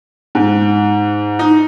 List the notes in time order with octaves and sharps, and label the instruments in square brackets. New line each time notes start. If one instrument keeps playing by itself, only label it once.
[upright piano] G#2
D#4